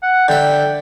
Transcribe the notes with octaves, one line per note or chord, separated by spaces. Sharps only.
F#5
D3 E5 G5